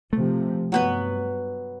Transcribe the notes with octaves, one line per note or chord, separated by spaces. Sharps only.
C3 F3 A3
G2 F#3 B3 B4